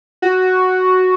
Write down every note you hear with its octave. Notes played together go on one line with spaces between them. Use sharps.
F#4